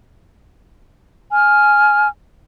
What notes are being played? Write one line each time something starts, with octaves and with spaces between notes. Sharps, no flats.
G#5 F6